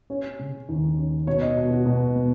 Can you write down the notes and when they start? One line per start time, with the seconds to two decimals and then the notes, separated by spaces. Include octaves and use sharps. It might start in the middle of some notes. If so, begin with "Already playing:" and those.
0.10 C#4 C#5
0.39 C#3
0.69 D#2
0.98 C#4
1.27 B2 C#5
1.42 D#5
1.57 B2
1.71 F#4
1.86 B2
2.15 B3